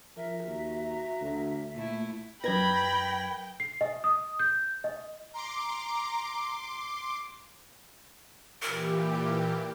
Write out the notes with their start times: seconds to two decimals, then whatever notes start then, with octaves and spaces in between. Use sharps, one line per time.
0.17 F3 A#4 E5
0.47 D#2 F#4 A#5
1.21 D2
1.75 A#2 A3 E4
2.44 F#2 A#4 B4 G5 B5 G#6 A#6
3.60 C7
3.81 D#5
4.04 D#6
4.40 G6
4.84 D#5
5.34 A#5 C6 D6
8.62 A#2 E3 G4 A#4